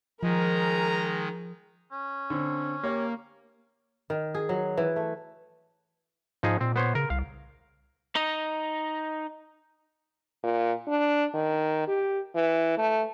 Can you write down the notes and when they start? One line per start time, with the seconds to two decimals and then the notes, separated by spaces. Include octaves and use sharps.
0.23 D#3 F3 G#3 G#4 A#4 A#5
1.91 C#4
2.30 D3 C4
2.83 A#3 G4 C#5
4.10 D#3
4.35 G#4
4.49 F#3
4.77 E3
4.96 A3
6.43 G#2 F3 D#4 G#4
6.61 A#2 C4
6.76 B3 C5 C#5
6.95 C#3 A#4
7.10 C2 F5
8.16 D#4 D#5
10.43 A#2
10.88 D4
11.34 D#3
11.88 G4
12.35 E3
12.78 A3